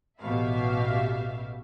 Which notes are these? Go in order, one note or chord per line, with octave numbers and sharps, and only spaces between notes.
A1 B2 G4 E5 F5